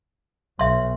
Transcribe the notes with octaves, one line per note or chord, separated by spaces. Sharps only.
B1 E5 C6